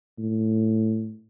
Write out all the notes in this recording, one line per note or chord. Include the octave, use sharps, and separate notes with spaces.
A2